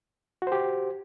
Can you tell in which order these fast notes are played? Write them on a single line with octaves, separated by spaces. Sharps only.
F#4 C5 G4